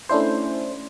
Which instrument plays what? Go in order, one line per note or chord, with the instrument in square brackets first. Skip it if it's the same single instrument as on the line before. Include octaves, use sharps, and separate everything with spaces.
[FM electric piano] A3 C#4 D4 E4 C5